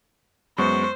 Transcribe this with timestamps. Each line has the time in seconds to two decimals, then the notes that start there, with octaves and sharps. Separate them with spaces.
0.58 F#2 G#3 B3 C5 C#6